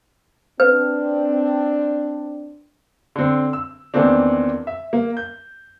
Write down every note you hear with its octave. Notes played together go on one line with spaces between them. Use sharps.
C4 D4 B4
D3 C4
E6
E2 D#3 A#3 C4 D4
E5
A#3
G6